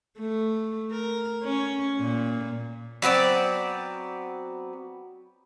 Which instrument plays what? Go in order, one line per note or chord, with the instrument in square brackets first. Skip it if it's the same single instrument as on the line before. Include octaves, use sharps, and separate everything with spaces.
[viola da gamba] A3
A#4
C#4
A#2
[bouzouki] F#3 B3 C4 D5